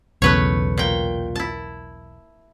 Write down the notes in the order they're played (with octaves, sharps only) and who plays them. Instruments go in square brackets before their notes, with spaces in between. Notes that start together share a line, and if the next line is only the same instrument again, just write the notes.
[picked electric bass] B1 E2 C#3 [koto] A3 B4 C#5
[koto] A#2 G5
E4 A5